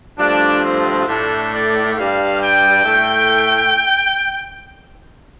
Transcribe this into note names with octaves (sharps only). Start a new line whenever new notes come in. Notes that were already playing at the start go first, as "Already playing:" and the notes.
G2 F3 A3 D4
C4
A2 A3 D4
D5
G2 G3 F5
G5
A2 A3